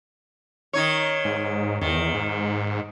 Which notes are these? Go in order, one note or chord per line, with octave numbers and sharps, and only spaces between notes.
D#3 D#4 C#5
G#2
E2 D#3
G#2